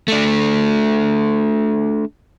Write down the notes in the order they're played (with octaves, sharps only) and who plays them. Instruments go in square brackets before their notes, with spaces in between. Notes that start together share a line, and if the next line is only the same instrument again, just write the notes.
[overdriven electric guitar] A3 D4